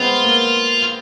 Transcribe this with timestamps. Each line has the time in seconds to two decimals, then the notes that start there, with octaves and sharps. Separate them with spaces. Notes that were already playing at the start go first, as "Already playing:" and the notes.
Already playing: G#3 B3 C4 F4
0.24 A#3